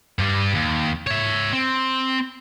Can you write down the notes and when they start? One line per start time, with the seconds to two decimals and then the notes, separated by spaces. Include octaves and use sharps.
0.19 G2 G3
0.54 D#2
1.07 C#5 E5
1.53 C4